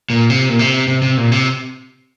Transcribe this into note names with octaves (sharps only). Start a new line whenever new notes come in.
A#2
C3
A#2
C3
C3
C3
A#2
C3